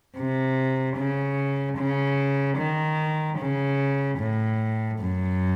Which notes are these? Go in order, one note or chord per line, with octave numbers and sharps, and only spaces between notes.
C3
C#3
C#3
D#3
C#3
A2
F#2